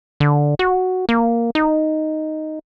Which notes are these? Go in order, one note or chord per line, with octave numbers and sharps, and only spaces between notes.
D3
F#4
A#3
D#4